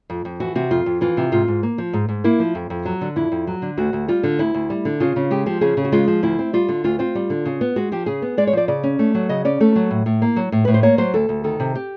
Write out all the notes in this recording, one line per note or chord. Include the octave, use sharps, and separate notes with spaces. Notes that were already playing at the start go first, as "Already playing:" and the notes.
F2
F2
E3 F#4
C3 F#4
F2 F4
F2
E3 F4
C3
G#2 F4
G#2
A#3
F3
G#2
G#2
A#3 E4
F3
F2
F2
F#3
D3
F2 E4
F2
F#3
D3
D2 F#4
D2
G3 F4
D3
D2 E4
D2
G3
D3
C#3 F4
C#3
G#3 G4
F3 G4
C#3 G#4
C#3
F#4
G#3 F4
F3
D2 E4
C4
G3 F4
D3
D2 F4
C4 F4
G3
D3
C#3
B3
G#3 F#4
F3 G4
C#3 G#4
B3
G#3 D5
C#5
F3 D5
C#3 D5
C#4
A3
F#3
C#3 D#5
C#4 D5
A3 A4
F#3
A2
A2
A#3
F#3
A2
A2 B4
C5
A#3 C#5
F#3 C5
D2 A4
D2
D#3 A4
C3
G4